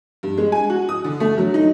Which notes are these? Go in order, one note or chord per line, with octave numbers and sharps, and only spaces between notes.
G2
G#3
G#5
F#4
D#6
D3
A3
F#3
D#4